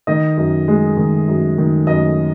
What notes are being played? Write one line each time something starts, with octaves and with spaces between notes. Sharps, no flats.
D#3 D#5
F#2
G#3
D#3
F#2
D#3
F#2 D#5